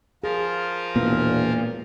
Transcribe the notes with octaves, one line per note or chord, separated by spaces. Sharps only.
F3 F4 G#4 A#4
E1 A#2 B3